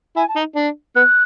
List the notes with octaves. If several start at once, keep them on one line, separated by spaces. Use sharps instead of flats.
E4 G#5
A5
D#4
D4
B3 F#6